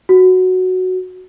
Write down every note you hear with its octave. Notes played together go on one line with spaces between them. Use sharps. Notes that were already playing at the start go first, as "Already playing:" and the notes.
F#4